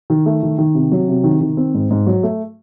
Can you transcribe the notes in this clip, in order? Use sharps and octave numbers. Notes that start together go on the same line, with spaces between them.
D#3
A3
D#3
D#3
C3
F#3
C3
D#3
D#3
C4
G#2
G#2
F#3
A3